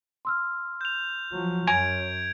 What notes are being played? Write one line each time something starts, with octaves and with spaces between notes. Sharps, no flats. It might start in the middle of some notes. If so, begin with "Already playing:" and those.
C6 E6 F6
G6 F7
F3 F#3
F#2 C#5 G#5 A#5 G#6 D7